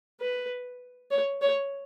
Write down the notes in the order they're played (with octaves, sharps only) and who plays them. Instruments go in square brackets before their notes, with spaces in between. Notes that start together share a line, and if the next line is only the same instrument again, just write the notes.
[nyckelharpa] B4
C#5
C#5